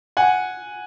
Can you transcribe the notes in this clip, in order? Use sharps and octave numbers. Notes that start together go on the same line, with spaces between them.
F#5 G#5